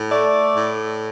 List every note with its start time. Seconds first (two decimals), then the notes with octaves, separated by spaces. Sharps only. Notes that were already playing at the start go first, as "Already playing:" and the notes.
Already playing: A2
0.10 A3 D5
0.55 A2